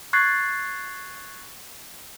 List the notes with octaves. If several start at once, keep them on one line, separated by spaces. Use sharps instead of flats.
C#6 F#6 G#6 A6 C7